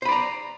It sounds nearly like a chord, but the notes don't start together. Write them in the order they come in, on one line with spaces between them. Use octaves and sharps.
C5 B5 D5 A#5